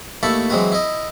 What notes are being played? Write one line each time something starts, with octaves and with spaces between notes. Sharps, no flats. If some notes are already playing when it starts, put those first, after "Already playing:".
D#2 A3 E4 A5 B5 C#6
E3 F#3 G#3 C4 F#4 B4
E4 D#5